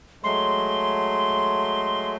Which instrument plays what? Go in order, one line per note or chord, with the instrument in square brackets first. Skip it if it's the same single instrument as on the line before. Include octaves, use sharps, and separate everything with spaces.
[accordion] F#3 G#3 A3 [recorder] C6